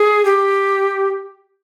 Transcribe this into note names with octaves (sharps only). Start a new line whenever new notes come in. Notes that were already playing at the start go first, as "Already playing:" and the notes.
Already playing: G#4
G4